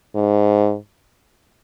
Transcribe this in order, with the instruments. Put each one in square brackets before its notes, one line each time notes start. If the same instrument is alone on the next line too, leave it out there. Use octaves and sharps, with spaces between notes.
[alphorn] G#2